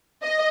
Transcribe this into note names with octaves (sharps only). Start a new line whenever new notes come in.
D#5